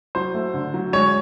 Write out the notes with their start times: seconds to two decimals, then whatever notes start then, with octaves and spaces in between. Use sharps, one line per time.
0.15 F#3 C5
0.34 A3
0.54 D3
0.74 F#3
0.93 G#3 C#5